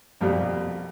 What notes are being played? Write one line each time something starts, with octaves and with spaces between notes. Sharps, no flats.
C2 F2 B2 G3